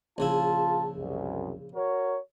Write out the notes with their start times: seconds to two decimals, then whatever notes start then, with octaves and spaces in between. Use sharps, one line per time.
0.18 A#1 C#3 E4 F4 A5
0.95 C2 F#2
1.75 F#4 A#4 C#5